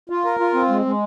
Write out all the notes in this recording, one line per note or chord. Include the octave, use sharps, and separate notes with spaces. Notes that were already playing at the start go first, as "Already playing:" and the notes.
F4
A#4
F4
C4
G#3
G#3